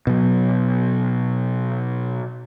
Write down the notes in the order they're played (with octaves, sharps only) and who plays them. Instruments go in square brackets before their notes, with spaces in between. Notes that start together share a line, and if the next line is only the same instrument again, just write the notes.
[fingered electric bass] B2 F#3